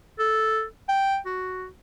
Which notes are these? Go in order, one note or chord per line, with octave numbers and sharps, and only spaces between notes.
A4
G5
F#4